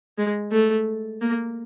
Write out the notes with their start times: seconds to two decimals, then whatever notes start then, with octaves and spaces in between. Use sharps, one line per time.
0.18 G#3
0.52 A3
1.21 A#3